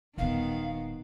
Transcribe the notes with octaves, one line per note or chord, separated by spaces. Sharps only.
D#1 D#3 B3 C#4 F5